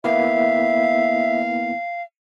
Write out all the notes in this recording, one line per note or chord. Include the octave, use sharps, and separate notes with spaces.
A#3 B3 E4 E5 F5